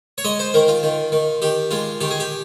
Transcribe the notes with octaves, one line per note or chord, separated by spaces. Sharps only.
C#5
G#3 D#5
C5
D#3 A#4
F4
D#3
D#3
D#3 G4
G#3 F4
D#3 G4
G#4
G4